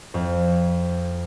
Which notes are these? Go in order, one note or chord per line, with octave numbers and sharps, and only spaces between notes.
F2